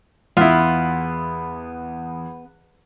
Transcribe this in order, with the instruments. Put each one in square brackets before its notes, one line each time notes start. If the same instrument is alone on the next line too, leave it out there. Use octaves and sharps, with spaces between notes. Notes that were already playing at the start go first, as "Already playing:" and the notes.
[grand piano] E2 [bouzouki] B3 [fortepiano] E4 F4